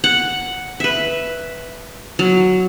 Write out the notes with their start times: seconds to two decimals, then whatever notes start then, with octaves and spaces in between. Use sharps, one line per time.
0.04 F#5
0.80 B4 E5
2.19 F#3